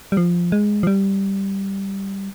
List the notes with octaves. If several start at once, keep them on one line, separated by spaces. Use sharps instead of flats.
G3
F3
G#3
F3
G3